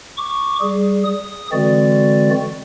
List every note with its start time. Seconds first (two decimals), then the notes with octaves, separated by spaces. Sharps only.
0.17 C#6 D6
0.61 G3 G#4
1.05 D#6
1.52 D3 E3 G#3 C4 F#4 D5